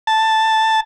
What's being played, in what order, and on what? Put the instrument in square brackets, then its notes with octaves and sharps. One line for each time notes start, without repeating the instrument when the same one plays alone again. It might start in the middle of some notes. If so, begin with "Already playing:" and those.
[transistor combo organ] A5